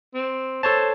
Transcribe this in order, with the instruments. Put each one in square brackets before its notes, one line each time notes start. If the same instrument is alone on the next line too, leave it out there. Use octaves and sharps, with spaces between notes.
[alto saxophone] C4
[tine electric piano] A4 C#5 A5 [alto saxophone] C5